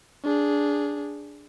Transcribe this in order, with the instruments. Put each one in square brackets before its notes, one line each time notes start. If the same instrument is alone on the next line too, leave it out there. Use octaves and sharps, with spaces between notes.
[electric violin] D4 G#4